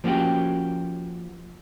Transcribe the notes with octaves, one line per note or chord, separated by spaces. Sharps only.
F3 A#3 C#4 F#4 G4